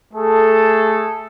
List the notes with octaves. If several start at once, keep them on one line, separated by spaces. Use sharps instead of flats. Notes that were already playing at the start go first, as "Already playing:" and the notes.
A3 G#4 A4